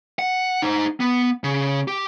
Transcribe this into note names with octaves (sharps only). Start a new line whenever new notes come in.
F#5
D#4 C5
B3
C#3
G4